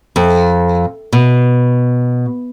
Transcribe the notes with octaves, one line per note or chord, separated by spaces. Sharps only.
F2
B2